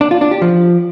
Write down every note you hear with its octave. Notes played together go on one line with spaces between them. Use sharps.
D4
F4
D4
G4
F3